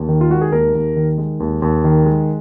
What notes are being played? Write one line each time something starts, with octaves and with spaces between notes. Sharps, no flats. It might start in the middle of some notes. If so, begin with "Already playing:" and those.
Already playing: D#2
D#3
F4
G#3 F#4
G#4
D#2 A#4
D#2
D#3
G#3
D#2
D#2
D#3
G#3